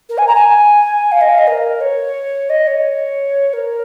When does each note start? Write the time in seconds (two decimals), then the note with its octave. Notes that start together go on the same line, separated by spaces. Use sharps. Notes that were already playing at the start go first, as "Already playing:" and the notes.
0.09 A#4
0.18 G#5
0.27 A#5
0.36 G#5
1.12 F5
1.21 D#5
1.29 F5
1.38 D#5
1.47 A#4
1.81 C#5
2.50 D#5
2.67 C#5
3.53 A#4